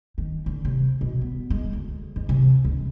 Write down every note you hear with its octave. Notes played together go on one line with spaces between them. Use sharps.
D#3
D3
C3
B2
B3
G#3
D2
G#2
C3
C#2